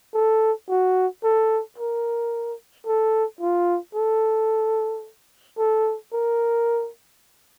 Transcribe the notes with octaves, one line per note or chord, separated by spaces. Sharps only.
A4
F#4
A4
A#4
A4
F4
A4
A4
A#4